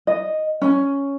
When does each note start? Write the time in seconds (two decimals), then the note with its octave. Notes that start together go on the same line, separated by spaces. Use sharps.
0.07 D#5
0.62 C#4